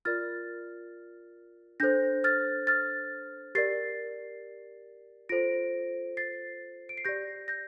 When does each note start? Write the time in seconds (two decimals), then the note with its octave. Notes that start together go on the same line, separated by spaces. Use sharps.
0.05 F4 A#4 D5 F6 A6
1.80 D4 A4 C5 G6 A#6
2.24 F6 A6
2.67 F6 A6
3.55 G4 A#4 D5 A6 C7
5.29 F4 A4 C5 A#6 D7
6.17 A6 C7
6.89 D7
6.97 C7
7.05 G4 D5 G6 A#6
7.48 G6 A#6